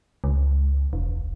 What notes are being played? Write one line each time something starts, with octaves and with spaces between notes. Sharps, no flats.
C#2
E1